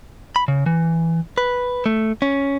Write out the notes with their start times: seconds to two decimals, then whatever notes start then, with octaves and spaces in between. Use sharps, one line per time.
0.36 B5
0.48 C#3
0.66 E3
1.38 B4
1.86 A3
2.22 C#4